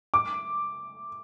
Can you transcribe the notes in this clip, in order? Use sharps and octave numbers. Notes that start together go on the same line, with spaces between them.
D6